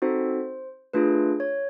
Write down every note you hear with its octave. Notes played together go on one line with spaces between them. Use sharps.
C4 D#4 F#4 A4 C5
A3 D4 F4 G#4 B4
C#5